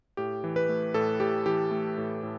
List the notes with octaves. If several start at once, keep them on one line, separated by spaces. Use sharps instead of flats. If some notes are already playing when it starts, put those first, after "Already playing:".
A2 G4
E3
B4
A3
A2 A4
A2 G4
E3 G4
A3
A2
A2